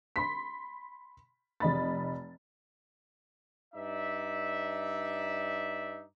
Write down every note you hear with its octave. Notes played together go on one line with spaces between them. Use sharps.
B5 C6 B6
F1 D#5 B5 A6
G2 D#4 D5 E5